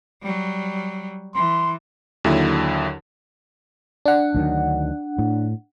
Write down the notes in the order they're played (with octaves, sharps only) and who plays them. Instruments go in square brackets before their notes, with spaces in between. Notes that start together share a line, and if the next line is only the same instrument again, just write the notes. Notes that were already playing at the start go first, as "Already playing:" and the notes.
[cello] F#3 G3
[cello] E3 [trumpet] C6
[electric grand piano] D#2 D3 F#3 E4
[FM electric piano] D4 F#5
[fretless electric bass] D2 D#3 F#3
A2